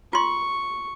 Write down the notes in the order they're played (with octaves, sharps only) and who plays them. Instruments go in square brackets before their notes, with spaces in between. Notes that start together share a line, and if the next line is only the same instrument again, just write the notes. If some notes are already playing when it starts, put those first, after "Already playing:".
[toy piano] F4 C6 [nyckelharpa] C#6